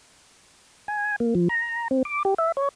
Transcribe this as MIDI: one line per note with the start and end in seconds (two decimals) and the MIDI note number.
0.88 1.16 80
1.20 1.34 58
1.35 1.48 53
1.49 1.88 82
1.91 2.03 60
2.05 2.23 86
2.25 2.34 67
2.38 2.52 76
2.57 2.69 73